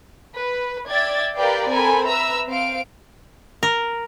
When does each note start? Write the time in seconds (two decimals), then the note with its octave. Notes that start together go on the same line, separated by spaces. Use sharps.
0.37 B4
0.90 D5 E5 G5 G#6 A6
1.35 G4 A#4 B4 D5 F5 G5
1.69 C4 A4 A#4 G#5 B5
2.07 B4 E5 A#5 B5 E6
2.48 C4 F5 D7
3.63 A#4